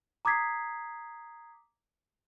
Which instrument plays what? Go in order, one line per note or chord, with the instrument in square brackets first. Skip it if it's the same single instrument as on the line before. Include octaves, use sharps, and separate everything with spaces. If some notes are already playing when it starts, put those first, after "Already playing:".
[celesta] A#5 D6 D#6 G#6 B6 C7